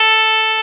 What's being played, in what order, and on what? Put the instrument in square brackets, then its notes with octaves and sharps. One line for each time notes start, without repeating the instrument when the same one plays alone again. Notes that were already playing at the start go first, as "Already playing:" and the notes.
Already playing: [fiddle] A4